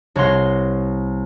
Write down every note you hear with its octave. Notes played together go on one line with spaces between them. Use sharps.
C2 C#5 F#5 C6 A#6